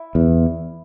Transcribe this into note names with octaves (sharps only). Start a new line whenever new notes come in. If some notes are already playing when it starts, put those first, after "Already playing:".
Already playing: E4
E2